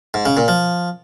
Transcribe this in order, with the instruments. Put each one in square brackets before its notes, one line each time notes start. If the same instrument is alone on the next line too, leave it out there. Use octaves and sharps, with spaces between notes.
[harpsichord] G#2
C#3
A#2
F3